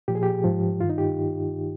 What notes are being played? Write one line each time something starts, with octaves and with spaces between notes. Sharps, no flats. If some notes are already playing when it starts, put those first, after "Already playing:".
A#2 F3 G4
G#4
G4
G#2 F3
G2 D#3 F4
D#4
G4